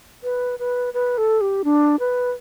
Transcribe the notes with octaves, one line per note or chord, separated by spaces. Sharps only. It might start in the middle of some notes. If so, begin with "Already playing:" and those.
B4
B4
B4
A4
G4
D4
B4